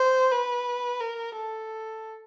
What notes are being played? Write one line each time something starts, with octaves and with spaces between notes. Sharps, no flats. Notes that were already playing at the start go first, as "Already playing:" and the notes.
Already playing: C5
B4
A#4
A4